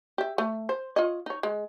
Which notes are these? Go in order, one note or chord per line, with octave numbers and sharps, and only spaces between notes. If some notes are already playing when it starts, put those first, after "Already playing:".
G4 E5
A3
C5
F4 C#5 D#5
D#4 C#5
G#3